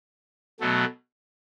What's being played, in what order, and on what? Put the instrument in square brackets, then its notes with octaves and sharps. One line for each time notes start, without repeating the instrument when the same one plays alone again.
[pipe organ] B2 F#3 A3